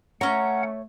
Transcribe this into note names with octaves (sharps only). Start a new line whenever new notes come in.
A3 C#4 C#5 F#5 A#5